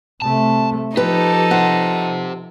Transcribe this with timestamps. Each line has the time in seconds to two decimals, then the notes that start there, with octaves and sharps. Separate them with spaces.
0.22 C3 A3 A5
0.97 F3 D#4 G4 A4 B4
1.51 G4 C5 F#5